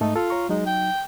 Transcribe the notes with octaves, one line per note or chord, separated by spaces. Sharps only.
G#2 A3 D#4 A4
F4 A4
C#5 A#5 C#6
F#3 G#3 D#4
G5